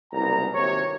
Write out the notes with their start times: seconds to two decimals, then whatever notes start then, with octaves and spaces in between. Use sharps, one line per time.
0.13 F#1 C2 B3 A#5
0.54 G#1 D#2 C3 C#5